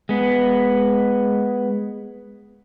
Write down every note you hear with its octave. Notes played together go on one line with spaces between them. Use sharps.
G#3 B3